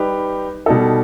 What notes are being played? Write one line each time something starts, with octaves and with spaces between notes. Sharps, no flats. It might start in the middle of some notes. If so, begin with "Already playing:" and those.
Already playing: G3 D#4 G4 B4
B2 G3 D#4 A4